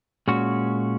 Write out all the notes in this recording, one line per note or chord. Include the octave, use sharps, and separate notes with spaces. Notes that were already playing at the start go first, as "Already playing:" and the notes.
A#2 G#3 C#4 F#4